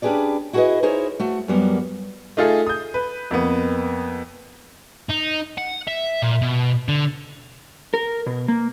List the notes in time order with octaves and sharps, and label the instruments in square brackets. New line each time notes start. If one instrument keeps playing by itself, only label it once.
[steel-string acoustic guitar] C#4 D4 G4 G#4 B4 D5
E4 F#4 G#4 A4 B4 D#5
D#4 E4 G#4 A#4 C5 C#5
A3 F#4
F#2 F#3 G3 A#3 B3
[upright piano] A3 D#4 F4 G#4 A4
D#6 G6
B4
F2 A#3 B3
[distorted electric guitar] D#4
F#5
E5
A#2
B2
D3
[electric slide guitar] A#4
B2
A#3